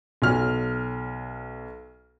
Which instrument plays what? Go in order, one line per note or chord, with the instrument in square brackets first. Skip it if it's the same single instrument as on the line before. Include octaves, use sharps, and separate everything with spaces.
[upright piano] B1 F#3 F6